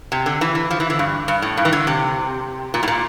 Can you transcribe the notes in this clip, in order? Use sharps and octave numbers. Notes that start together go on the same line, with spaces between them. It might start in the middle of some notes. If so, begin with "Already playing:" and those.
C3
D3
E3
E3
F3
E3
D3
G2
G2
A2
G2
E3
D3
C3
A#2
A2
A#2